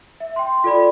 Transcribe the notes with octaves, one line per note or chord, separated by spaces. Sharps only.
E5
G5 C6
F4 A4 D5 B5